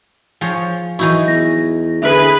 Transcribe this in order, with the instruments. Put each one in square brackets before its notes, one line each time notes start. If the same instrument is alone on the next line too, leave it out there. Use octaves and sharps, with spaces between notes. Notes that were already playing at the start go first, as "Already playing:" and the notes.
[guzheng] F3 G#4 C#5
[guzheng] E3 D#4 E4 [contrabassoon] F#3 [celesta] C#6
[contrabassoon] E2 [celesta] A#6
[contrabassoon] D3 [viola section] G#4 B4 [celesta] E5